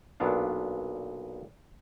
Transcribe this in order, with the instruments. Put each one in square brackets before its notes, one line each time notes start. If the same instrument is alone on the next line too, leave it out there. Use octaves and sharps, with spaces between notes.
[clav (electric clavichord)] B1 A#2 B3 D4 F5